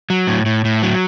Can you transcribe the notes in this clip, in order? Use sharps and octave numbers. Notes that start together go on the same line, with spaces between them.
F#3
A2
A2
A2
F#3